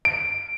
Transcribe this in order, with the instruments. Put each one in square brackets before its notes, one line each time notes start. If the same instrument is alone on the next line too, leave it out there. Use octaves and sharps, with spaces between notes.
[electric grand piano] D7